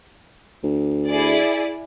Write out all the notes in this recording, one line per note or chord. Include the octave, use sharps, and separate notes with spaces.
D2
E4 G#4 D5